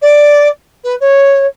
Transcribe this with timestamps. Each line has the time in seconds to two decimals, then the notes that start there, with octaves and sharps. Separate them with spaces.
0.02 D5
0.84 B4
1.01 C#5